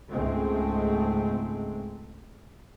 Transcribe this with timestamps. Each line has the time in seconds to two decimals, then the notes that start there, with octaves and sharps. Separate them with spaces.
0.12 C#2 G#2 G#3 A3 C4